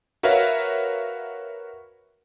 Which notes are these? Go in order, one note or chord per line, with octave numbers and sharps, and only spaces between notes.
F#4 A#4 B4 C#5 E5 F5